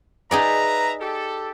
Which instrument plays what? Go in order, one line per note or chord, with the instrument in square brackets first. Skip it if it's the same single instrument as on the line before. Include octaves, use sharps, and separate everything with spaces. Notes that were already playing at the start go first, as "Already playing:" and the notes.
[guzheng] D#4 G#4 D5 [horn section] B4 E5 A#5
[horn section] G4 A4